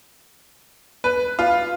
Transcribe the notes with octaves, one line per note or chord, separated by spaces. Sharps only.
B4
F4